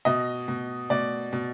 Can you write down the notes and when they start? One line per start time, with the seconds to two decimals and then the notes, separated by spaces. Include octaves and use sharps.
0.05 B2 D#5
0.48 B2
0.90 B2 D5
1.33 B2